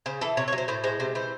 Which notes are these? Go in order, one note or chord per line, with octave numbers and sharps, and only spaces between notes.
C#3 C5
E3 A4
C3 C#5
C#5
F#3
C5
A2 C5
G#3 C5
C3 C5
E3 C5